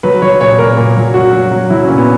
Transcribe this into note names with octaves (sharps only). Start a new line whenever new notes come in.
F#3 B4
F#3 C#5
A#2 C#5
A#2 A#4
A#2
F#3
F#3 F#4
F#3
F#3
F#3 E4
A#2 C#4
B3